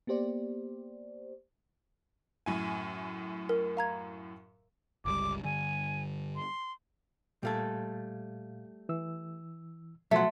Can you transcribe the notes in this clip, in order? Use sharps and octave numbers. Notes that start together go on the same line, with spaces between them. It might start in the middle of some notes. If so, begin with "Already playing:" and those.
A#3 B3 G4 C5 D5
F#2 A2 G#5
A#4
F5 A#5 G#6
G1 C#2 G3 D6
G2 D3 G#5
C6
A#2 G3 A3 A4 F5 G#6
E3 E6
B2 F3 F#3 A3 E5 F#5 C6